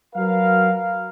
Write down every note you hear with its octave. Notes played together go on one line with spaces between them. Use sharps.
F#3 F#4 A#4 B4 F5